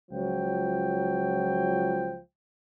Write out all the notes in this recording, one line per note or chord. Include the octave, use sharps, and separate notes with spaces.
C#2 F3 F#3 G5